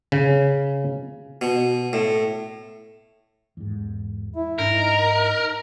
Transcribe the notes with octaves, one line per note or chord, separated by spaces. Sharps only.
C#3
B2
A2
E2 G#2
E4
G#2 D4 A#4
D#4